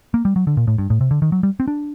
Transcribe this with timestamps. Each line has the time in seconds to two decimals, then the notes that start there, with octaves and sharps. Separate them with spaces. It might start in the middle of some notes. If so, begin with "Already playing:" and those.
0.14 A#3
0.25 G3
0.36 F#3
0.47 D3
0.57 A#2
0.67 A2
0.78 G2
0.90 A2
1.01 C3
1.11 D3
1.22 D#3
1.32 F#3
1.43 G3
1.60 C4
1.68 D4